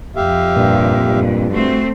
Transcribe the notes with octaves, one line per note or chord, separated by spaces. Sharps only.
F2 G4 E5 F5
G2 A#2
G2
A3 C4 F#4